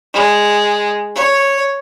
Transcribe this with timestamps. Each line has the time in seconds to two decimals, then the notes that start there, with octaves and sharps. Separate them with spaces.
0.14 G#3
1.15 C#5